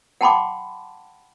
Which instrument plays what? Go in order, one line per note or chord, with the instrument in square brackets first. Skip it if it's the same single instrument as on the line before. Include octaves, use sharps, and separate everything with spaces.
[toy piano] F#5 G5 A5 B5 C6 D6